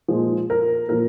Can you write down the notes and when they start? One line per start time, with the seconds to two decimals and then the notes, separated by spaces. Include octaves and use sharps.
0.08 A#2 F3 G#3
0.50 A#4
0.89 A#2 F3 A#4